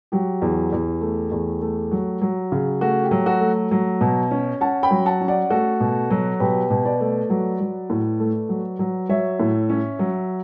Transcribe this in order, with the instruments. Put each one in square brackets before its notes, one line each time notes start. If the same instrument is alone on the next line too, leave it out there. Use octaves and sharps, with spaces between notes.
[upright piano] F#3 G4
E2
E2
A3
E2
A3
F#3
F#3
C#3
A3 F#4
G4
F#3
F#4 A4
A3
F#3
B2
C#4
C#4 F#5 A5
G5 B5
F#3
F#5 A5
C#4
D5 F#5
A3 F#4 A4
B2
F#3
B2 G4 B4
B2
B4 D5
A3
F#3
F#3
A2
A3
F#3
F#3
F#3 C#5 E5
A2
C#4
F#3